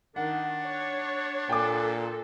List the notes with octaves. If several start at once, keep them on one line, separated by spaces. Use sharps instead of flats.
D#3 D4 F#5
C#5
A#2 A4 G5 G#5 D6